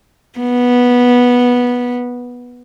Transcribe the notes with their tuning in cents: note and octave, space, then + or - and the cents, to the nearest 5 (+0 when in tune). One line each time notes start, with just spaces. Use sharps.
B3 -10